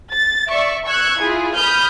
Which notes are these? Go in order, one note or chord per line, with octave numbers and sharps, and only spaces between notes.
A6
D5 E5 C#6
C#6 E6 F#6 G#6
E4 F4 G#4
B5 D#6 F6 G6